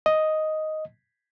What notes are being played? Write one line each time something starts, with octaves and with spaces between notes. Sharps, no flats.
D#5